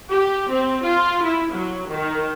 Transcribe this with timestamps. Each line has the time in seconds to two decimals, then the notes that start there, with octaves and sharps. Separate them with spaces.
0.11 G4
0.51 C4
0.83 F4
1.24 E4
1.53 F#3
1.91 D#3